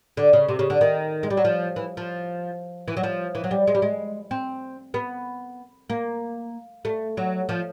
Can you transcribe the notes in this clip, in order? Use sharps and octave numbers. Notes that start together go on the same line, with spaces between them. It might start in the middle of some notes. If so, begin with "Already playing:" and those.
D3
C#3
C3
C#3
D3
D#3
G#3
G3
F#3
F3
E3
F3
E3
F#3
F3
E3
F#3
G3
G#3
G3
G#3
C4
B3
A#3
A3
F#3
F3